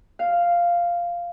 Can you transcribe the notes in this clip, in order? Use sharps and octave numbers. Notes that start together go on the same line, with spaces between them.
F5